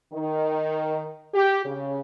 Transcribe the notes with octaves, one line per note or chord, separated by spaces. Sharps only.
D#3
G4
C#3